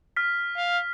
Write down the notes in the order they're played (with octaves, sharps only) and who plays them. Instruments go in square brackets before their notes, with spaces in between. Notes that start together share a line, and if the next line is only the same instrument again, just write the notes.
[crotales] F6 B6
[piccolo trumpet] F5